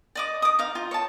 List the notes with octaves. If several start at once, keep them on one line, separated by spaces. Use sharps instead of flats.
D5 D#5 D6
D6 D#6
D#4 F5
F4
C#5 A5